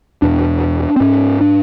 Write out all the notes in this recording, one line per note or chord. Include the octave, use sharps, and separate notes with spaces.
E2 B2 D4
C4
G#2 C#4
D4